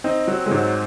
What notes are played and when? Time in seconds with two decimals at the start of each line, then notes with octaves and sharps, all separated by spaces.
0.04 C4 D#4
0.27 F#3
0.46 G#3
0.51 G#2 F#3